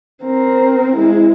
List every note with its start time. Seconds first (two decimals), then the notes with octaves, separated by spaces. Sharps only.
0.23 C4 A#4
0.96 G#3 E4